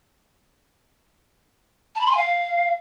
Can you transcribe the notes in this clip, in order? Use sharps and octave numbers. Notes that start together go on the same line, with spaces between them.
A5
B5
C6
G#5
F5